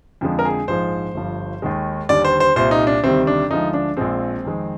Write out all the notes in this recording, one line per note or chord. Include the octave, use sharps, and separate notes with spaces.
F2 D3 F3 G#3
A#4
G#4
A#1 G#2 F3 G#3 C5
G1 G2 F3
D#2 D#3 G#3
D#2 D3 G3 D5
C5
C5
C2 A#2 G3 C5
D#4
D4
D2 C3 D#3 G3 C4
D4
D2 D3 F3 G#3 D#4
D4
A#1 A#2 F3 G#3 C4
F2 D#3 G#3